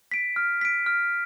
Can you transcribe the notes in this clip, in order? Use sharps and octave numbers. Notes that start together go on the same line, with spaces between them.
B6 D7
F6
B6 D7
F6